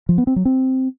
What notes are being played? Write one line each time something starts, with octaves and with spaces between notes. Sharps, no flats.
F3
B3
C4
F#3
C4